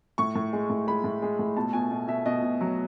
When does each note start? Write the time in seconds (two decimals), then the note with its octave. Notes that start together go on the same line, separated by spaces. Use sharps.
0.18 A2 C#6
0.35 A2
0.53 G#3
0.70 A2
0.87 G#3 B5
1.04 A2
1.22 G#3
1.39 A2
1.57 B2 A5
1.73 B2 G#5
1.91 B2
2.08 B2 E5
2.26 B2 D#5
2.42 B2
2.61 F#3